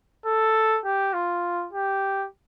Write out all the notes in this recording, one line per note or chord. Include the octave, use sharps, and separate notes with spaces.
A4
G4
F4
G4